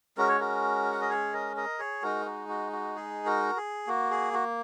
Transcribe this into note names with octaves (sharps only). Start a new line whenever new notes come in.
G#3 C#4 F#4 A#4
C#5
F#4 A#4
F#5
D#5
G#4 C#5
A#4 D#5
A#4 D#5
G#4 C#5
G#3 D#4 F#4 A#4
F#4
F#4
F#4
G#4
F#4 A#4
G#4
A#3 F#4
G#4
F#4